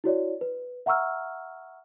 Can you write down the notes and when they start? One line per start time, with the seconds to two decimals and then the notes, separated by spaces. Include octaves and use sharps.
0.04 E4 F#4 C#5 D5
0.41 B4
0.86 E5 F#5 A#5 C#6 E6 F6